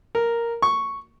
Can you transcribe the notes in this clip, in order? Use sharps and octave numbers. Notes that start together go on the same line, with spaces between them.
A#4
C#6